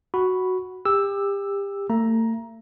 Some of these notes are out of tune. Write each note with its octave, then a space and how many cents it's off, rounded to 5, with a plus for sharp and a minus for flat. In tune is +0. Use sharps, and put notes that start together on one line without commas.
F#4 +0 B5 +0
G4 +30 E6 +0
A3 +40 A#5 +10